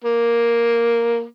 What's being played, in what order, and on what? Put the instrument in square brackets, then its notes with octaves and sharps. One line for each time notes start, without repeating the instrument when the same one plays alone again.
[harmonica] A#3